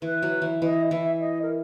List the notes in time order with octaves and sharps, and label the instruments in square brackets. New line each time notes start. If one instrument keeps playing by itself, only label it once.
[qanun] E3 [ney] B4
[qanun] F#3
E3
[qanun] E3 [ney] D#5
[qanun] E3 [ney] E5
[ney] D#5
A#4